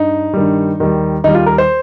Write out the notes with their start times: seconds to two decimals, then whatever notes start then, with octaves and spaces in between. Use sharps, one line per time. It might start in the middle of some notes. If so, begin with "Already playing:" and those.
Already playing: G2 D#4
0.34 G2 D#3 G3
0.79 D#2 D#3 G3
1.24 D#2 D#3 G3 D#4
1.35 F4
1.46 A#4
1.58 C5